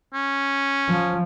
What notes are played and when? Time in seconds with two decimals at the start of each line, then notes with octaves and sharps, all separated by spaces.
0.14 C#4
0.89 F3